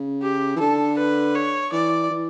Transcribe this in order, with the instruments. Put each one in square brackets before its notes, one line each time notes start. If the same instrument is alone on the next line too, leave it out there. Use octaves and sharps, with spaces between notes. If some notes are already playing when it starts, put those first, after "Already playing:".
Already playing: [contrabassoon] C#3
[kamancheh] G4
[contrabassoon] E3
[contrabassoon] D3 [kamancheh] A4
[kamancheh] B4
C#5
[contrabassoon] E3 [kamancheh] D5
[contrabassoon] E3